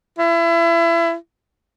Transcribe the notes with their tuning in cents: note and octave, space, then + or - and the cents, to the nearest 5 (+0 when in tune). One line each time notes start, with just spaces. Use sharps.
E4 +30